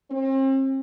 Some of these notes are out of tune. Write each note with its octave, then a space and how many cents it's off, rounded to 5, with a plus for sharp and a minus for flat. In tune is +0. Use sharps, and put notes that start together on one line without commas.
C4 +40